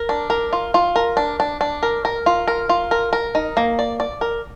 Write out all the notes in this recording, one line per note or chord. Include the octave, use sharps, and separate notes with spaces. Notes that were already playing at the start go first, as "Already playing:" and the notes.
Already playing: A#4
D4
A#4
F4
F4
A#4
D4
D4
D4
A#4
A#4
F4
A#4
F4
A#4
A#4
D#4
A#3
D5
D5
A#4